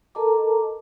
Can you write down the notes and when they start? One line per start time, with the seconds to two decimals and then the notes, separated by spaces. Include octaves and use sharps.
0.15 A4 A#4 D#5 A5 A#5 D6